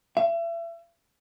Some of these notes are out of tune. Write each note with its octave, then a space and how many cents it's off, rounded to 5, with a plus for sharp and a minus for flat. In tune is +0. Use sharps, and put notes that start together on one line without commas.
E5 +35